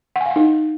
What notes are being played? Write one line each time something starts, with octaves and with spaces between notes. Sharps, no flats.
F#5
G#5
F5
F#5
D#4